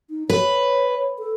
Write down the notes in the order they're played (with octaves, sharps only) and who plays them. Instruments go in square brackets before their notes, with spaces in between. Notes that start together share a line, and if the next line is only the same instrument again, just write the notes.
[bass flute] D#4
[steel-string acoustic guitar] B4 [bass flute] C#5
[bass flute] A4